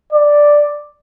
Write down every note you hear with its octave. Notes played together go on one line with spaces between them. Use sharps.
D5